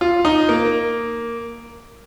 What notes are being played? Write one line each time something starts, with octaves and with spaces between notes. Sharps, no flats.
F4
D#4
A#3